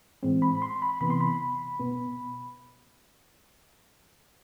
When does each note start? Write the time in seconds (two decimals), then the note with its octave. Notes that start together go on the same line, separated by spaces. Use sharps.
0.23 A2 E3 G#3 C4
0.42 B5
0.62 C6
0.82 B5
1.01 C3 E3 B3 B5
1.10 C6
1.21 B5
1.80 B2 B3